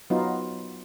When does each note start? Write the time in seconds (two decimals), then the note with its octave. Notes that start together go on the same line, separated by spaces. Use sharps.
0.10 F#3 B3 D#4 F4